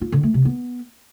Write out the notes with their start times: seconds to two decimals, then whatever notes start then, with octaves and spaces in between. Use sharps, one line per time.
0.01 F4
0.12 D3
0.23 A3
0.34 C3
0.45 B3